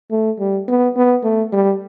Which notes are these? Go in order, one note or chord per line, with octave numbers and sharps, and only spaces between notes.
A3
G3
B3
B3
A3
G3